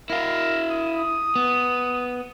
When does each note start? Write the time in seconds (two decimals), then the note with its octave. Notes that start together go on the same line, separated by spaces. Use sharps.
0.10 E4 A#4 F5
0.70 D#6
1.36 B3